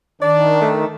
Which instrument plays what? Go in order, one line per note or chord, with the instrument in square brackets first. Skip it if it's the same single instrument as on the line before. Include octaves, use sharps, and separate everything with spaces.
[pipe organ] D#3 [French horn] D4 [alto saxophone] D5
[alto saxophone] A3